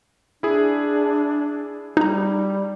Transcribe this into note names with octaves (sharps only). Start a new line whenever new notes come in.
D4 E4 G#4
G3 D#4 A#5